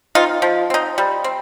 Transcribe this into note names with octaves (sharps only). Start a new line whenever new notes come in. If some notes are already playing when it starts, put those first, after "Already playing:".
C4 D#4 F4
F3
C4 D#4
G3
C4